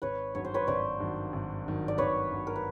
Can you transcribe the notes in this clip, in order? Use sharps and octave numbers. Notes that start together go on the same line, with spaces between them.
G#1 B4 C#5
G2 D#3 F#3 C#5
C5
B4 C#5
G#1 C5 D5
G2 D#3 F#3
G#1
G2 D#3 F#3
D5
G#1 B4 C#5
G2 D#3 F#3
A#4
B4